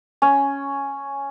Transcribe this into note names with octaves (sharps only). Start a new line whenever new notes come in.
C#4